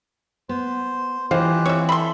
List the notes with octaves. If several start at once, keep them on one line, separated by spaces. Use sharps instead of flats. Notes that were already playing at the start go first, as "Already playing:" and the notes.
B3 C5
E3 F4 G4 C5 D#5 F5 F#6
C4 C#5 E5
A4 E5 B5 C6